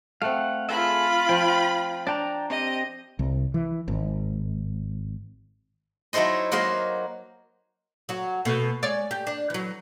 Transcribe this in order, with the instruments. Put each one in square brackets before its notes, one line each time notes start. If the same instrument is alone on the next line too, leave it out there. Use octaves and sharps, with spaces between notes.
[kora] A3 C4 [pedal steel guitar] F5 F#5
[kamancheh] F4 B5 [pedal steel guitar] G#4 A4 E5
[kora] F3 [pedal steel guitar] G5
[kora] D4 [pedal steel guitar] D5 G5 A#5
[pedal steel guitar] C4 G4 [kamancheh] D#5
[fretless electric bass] C2
E3
G#1
[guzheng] F#3 D#4 E4 A4 C5 D#5
F#3 A#3 C5 D#5 F5
[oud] F#3 F#4
B2 A3
G#3 C#5 D5
G4
D4
E3 F#3